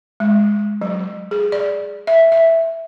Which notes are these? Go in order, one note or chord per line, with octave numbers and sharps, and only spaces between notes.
G#3
F#3
G#4
D5
E5
E5